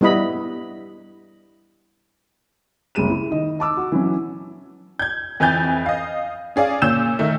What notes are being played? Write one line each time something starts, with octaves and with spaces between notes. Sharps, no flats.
G3 B3 E4 D#5 B5
F#1 C2 G#3 D#7 E7
E4
D#3 D#5
D#5 A5 D6 E6
F#4
E3 F#3 C#4
G6 G#6
F2 E3 G#5 G6 A6
D#5 F5
C#4 G#4 D5 F5
A#2 C#4 E6 G6 E7
D#3 A3